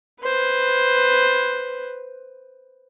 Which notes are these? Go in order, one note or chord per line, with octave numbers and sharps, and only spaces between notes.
B4 C5